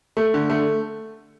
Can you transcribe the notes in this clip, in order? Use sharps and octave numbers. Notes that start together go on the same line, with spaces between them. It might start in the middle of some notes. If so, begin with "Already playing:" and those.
A3
D3
A3